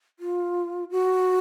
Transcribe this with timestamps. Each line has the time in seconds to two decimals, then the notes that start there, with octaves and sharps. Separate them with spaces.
0.19 F4
0.91 F#4